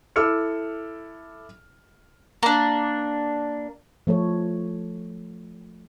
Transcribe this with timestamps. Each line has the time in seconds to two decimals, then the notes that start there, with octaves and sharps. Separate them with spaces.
0.16 E4 A4 D6 E6 F6 C#7
2.43 A#3 D4
4.07 F3 A3 A4 C#5